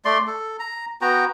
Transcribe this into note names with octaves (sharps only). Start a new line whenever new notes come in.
A3 D5 C6
A4
A#5
B3 F#4 G5 A#5